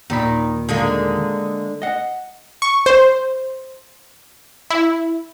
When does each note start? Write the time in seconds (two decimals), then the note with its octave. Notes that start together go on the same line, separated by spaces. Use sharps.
0.10 D#2 A#2 D#3 B5
0.69 D3 G#3 A#3
1.82 D#5 F#5
2.62 C#6
2.86 C5
4.70 E4